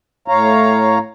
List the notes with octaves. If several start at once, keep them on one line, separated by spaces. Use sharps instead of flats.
A2 C#5 F5 A#5